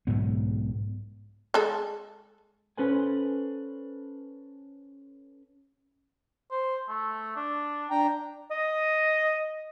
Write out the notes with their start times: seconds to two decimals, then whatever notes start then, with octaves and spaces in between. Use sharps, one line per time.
0.07 B1 G#2 B3
1.54 G#3 A4
2.77 C#4 A4 B4 C5 G#5
6.51 C5
6.88 A3
7.36 D4
7.91 D4 G5 A#5
8.51 D#5